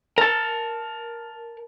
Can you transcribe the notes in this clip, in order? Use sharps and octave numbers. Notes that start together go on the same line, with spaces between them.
A#4 A5